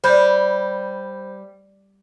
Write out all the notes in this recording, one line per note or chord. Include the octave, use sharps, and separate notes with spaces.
G3 C5 B5 G6